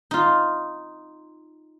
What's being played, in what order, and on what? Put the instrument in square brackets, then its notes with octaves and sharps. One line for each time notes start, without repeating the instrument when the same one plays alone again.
[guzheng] D#4 F4